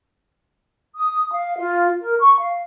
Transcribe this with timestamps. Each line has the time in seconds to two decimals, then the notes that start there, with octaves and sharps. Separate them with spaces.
0.96 D#6
1.32 F5
1.59 F4
1.99 A#4
2.20 C#6
2.39 F5